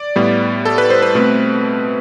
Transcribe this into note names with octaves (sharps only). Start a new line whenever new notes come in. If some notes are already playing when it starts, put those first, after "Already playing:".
Already playing: D5
A2 G3 B3
A4
B4
C5
B4
B2 A3 C4